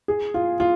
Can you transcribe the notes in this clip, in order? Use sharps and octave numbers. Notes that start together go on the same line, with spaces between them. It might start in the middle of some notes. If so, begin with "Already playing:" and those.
G#4
F4
F4